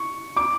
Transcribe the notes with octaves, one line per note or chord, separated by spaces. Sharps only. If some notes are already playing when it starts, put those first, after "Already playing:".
Already playing: C#6
D6